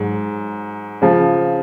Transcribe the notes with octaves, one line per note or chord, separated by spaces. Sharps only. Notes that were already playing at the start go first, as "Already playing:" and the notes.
Already playing: G#2 F#3
C#3 F3